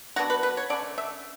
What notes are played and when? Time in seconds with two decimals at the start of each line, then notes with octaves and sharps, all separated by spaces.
0.16 F#3 B3 D4 F#4
0.30 B4
0.43 B4
0.57 C#5
0.70 D3 A3 C#4 D5
0.98 E5